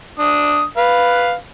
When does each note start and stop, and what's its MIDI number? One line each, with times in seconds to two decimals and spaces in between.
0.19 0.64 62
0.19 0.64 87
0.77 1.34 71
0.77 1.34 77